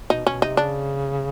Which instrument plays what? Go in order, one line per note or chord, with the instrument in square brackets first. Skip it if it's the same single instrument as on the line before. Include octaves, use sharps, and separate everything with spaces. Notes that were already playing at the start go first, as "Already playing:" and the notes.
[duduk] B2 [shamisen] D#4
[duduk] B2 [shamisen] C#4
[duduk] C3 [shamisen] D#4
[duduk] C#3 [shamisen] D4